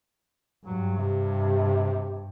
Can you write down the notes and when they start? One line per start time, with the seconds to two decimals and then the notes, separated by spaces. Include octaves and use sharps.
0.66 G2 F#3
0.97 C3